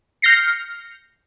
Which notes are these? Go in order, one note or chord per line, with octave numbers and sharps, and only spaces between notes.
F6 G6 A#6 C7 C#7